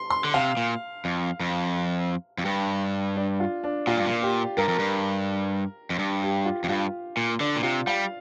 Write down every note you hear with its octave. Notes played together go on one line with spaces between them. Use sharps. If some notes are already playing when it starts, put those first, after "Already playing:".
Already playing: C6
C6
D3
C3 F5
A#2
F2
F2
F2
G2 G5
D4
F4
D4
A#2 F4
G2
A#2
G4
G2 A#4
F2
G2
F2
G2
G4
F4
F2
G2 F4
A#2
D3 D4
A#2
C3 F4
G3 F5